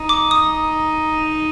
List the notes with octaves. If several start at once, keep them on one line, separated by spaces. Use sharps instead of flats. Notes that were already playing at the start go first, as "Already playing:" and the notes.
Already playing: D#4
D6
D#6